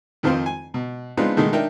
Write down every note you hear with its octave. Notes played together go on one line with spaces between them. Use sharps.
F2 D#3 F3 C4 F4
G#5
B2
G#3 B3 C4 D4 D#4 F4
B2 D#3 G#3 A3 D#4
D4 D#4 A#4 E5 G5